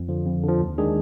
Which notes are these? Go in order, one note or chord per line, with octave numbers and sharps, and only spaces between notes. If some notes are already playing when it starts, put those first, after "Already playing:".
Already playing: F2
D3 F3
F2
D3 F3
D#2
D#3 G#3 D4 G#4